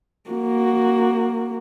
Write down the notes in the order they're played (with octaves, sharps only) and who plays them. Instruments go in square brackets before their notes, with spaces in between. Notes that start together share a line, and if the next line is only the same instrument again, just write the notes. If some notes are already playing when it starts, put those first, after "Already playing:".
[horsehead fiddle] A#3 F#4